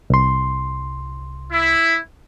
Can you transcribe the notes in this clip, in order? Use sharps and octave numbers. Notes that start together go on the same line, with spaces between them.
C2 C6
E4